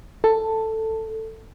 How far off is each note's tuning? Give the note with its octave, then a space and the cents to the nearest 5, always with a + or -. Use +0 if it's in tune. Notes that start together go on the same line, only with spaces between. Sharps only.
A4 +10